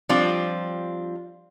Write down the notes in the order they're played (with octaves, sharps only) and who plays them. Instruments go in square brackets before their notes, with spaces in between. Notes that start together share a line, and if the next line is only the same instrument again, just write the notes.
[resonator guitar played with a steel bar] F3 G3 C4 D4 F4